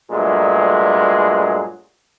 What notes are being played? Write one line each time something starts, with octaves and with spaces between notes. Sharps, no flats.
G2 A#2 F#3 G#3 A3